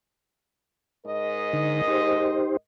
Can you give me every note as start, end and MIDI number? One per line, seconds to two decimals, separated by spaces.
1.06 2.55 44
1.06 2.55 70
1.06 2.55 75
1.53 1.82 50
1.53 1.82 63
1.87 2.57 63
1.87 2.57 67
1.87 2.57 72